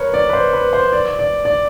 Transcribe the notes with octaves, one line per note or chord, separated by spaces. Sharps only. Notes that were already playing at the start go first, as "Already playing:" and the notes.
Already playing: A#4 B4 C#5
D5
B4
C5
B4
C5
D5
D5
D5